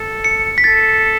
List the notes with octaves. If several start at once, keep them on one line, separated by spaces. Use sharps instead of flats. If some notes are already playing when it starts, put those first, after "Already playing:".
Already playing: A4
C#7
B6
A4 A6